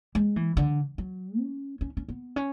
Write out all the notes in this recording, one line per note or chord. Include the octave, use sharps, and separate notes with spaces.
G#3
E3
D3
F#3
C#4
C#4
C#4
B3
C#4